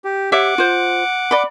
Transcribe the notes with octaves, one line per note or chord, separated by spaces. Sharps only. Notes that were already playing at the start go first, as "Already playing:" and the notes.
G4
G4 C#5 E5 F#5 D6
F4 C5
D5 B5